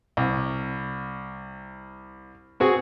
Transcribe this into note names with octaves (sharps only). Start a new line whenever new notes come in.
C2
C4 F#4 G#4